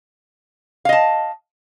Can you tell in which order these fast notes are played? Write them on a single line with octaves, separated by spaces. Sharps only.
F5 D#5 A5